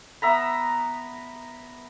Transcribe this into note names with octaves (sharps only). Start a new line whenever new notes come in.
B3 E5 A#5 B5